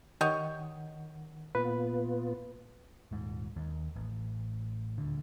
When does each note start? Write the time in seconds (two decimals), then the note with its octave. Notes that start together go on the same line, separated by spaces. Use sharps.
0.21 D#3 G4 C#5 D#5 F#5
1.55 A#2 B3 F4 B4
3.11 D#1 G#2
3.56 D#2
3.96 A1
4.98 D#1 D2 D3